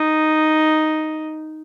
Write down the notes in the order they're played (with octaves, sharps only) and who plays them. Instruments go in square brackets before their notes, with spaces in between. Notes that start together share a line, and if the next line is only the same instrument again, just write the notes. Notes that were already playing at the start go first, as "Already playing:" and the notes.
Already playing: [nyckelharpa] D#4